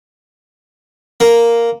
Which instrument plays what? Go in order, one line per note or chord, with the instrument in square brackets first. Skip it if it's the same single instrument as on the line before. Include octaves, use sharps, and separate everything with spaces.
[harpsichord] A#3